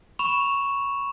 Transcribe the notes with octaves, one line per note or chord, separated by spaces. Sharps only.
B5 C#6 E7 F7